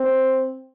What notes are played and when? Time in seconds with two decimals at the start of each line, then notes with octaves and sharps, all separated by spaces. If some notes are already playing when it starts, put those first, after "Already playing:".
Already playing: C4